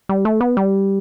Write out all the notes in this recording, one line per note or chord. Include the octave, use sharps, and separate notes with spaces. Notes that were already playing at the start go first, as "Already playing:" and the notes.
G3
A3
B3
G3